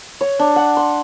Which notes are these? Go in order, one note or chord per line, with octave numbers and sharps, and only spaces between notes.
C#5
D4
F#5
C6